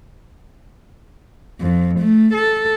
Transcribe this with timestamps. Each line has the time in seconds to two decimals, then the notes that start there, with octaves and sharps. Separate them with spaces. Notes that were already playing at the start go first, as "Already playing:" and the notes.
1.61 F2
1.98 A3
2.32 A4